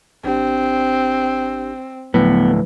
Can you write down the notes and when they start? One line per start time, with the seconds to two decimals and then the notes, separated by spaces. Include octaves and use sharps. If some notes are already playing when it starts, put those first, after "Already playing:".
0.24 G#1 C4 D4 G4
2.14 D2 A2 F3 F#3 B3 B4